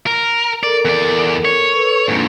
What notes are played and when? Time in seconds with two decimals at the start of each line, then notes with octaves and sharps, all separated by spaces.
0.06 A#4
0.63 A4 A#4 D5
0.85 E2 D5
1.45 C#5
1.72 A4 B4 E6
2.08 F2 G#2 A#3 D4